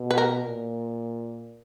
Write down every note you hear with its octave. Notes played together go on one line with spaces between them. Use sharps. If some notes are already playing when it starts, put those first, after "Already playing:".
Already playing: B2
B4
A#4
A#2